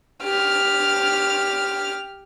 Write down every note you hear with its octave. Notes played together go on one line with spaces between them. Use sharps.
G4 F6